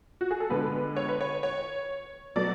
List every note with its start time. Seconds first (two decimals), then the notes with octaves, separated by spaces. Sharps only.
0.21 F#4
0.31 G#4
0.40 A4
0.49 D3 G#3 B3 B4
0.97 C#5
1.09 B4
1.21 C#5
1.43 C#5
2.36 B2 F#3 A3 D5